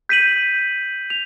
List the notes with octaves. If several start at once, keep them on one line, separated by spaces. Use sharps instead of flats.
G6 B6 D#7 F#7
F7